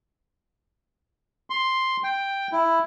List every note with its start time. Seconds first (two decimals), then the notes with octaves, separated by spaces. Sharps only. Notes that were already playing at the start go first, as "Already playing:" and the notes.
1.50 C6
2.04 G5
2.52 E4